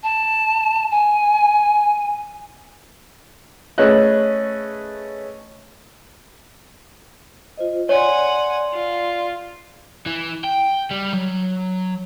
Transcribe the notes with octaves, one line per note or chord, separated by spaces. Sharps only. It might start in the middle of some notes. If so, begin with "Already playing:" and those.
A5
G#5
A3 C#4 G#4 B4 D#5 F#6
F4 C5 D#5
C#5 D5 F#5 G#5 C6
F4
E3
G5
G3
F#3